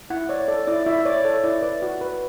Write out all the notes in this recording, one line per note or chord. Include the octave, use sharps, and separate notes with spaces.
E4 F#5
C#5 D5
A4 D5
E4 D5
E4 E5
C#5 D5
A4 C#5
E4 D5
B4 D5
F#4
B4